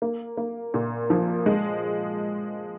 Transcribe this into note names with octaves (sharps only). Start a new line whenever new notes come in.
A#3
A#3
A#2
F3
G#3